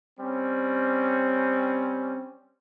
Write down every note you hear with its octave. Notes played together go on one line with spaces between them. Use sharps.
G3 C4 C#4